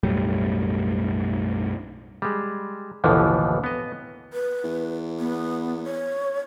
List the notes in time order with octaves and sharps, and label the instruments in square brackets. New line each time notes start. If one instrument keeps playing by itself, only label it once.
[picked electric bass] B1 F#2 A2 G3
[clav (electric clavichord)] G3 G#3
A1 D#2 B2 D3 E3 F3
B3 D#5
[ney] B4
[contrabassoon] E2
[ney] B3
C#5